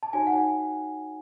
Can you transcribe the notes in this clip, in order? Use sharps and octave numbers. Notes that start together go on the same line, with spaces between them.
A5
D#4 F#4 C#5 G#5
F#5
G#5